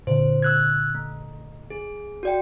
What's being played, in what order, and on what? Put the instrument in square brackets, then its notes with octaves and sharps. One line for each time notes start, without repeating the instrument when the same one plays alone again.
[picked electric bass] A#2 D3 [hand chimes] C5
[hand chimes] E6 F#6 G#6
A3
G#4
F#4 D5 G5